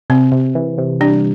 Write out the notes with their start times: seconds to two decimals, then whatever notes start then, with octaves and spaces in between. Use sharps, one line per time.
0.10 C3 C4
0.32 C3
0.55 E3
0.78 C3
1.00 G3 D4